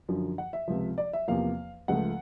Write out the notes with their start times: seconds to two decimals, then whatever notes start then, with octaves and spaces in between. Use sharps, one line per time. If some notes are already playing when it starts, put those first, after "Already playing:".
0.09 F#2 D3 F3
0.38 F#5
0.53 E5
0.68 C#2 C3 F3
0.98 D5
1.13 E5
1.28 E2 C3 F3 A#3 F5
1.88 C#2 C#3 F3 A3 F#5